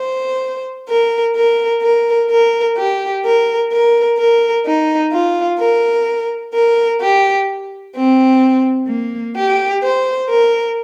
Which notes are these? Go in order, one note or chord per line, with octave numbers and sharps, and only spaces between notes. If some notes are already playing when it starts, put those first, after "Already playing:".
Already playing: C5
A#4
A#4
A#4
A#4
G4
A#4
A#4
A#4
D#4
F4
A#4
A#4
G4
C4
A#3
G4
C5
A#4